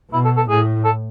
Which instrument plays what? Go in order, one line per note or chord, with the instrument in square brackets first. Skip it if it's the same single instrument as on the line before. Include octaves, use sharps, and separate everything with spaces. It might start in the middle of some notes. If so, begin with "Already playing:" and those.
[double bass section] B2 [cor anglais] E4
[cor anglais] A4
A4
[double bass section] A2 [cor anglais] G#4
[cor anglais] A4